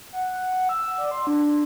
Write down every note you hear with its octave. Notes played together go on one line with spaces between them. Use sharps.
F#5
E6
D5
C6
D4